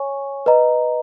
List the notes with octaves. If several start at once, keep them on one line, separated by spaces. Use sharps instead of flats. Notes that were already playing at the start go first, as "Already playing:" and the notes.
Already playing: C#5 G#5 C#6
B4 D#5 A#5